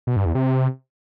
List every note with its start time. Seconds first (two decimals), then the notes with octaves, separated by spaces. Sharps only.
0.07 B2
0.16 G2
0.26 E2
0.35 C3